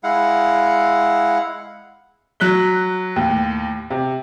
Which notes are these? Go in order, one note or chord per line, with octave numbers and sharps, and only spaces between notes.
G#3 E4 F5 F#5
F#3 F#6 B6 G7
D#2 A2
C3